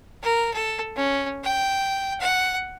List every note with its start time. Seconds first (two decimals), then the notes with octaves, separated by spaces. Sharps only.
0.23 A#4
0.53 A4
0.96 C#4
1.44 G5
2.20 F#5